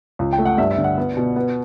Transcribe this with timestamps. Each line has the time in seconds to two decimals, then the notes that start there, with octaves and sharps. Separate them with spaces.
0.19 C#2
0.33 G5
0.38 A3
0.45 F#5
0.58 G2 E5
0.71 E5
0.78 D3
0.84 F#5
0.98 B3
1.17 B2
1.36 B3